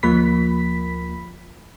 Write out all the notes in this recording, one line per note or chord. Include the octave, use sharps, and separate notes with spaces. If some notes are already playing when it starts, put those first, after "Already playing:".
D2 F3 A#3 B5 B6